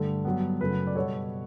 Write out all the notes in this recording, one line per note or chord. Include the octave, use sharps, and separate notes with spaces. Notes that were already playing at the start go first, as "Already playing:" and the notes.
Already playing: G2 D3 A3
G2 F#3 B3
F#2 C#3 F#3 A3 B4
D5
B2 G3 B3 A4 C#5